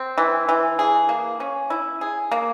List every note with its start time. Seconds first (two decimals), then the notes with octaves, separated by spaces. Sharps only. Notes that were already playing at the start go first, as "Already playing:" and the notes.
Already playing: C4
0.18 E3
0.49 E3
0.79 G#4
1.09 A#3
1.40 C#4
1.70 E4
2.01 G#4
2.32 A#3